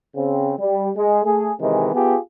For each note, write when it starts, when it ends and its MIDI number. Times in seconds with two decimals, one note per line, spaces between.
0.15 0.52 49
0.15 0.52 60
0.58 0.88 55
0.95 1.21 56
1.24 1.51 57
1.24 1.51 68
1.60 1.91 48
1.60 1.91 51
1.60 1.91 52
1.60 1.91 56
1.93 2.16 59
1.93 2.16 65
1.93 2.16 67
1.93 2.16 68